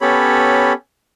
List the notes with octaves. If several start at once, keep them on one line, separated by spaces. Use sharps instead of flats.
B3 C#4 G4 A4 C#5 B5